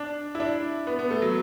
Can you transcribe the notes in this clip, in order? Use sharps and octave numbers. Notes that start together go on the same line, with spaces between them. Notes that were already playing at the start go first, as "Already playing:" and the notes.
Already playing: D4
E4
D4
B3
B3
A3
F#3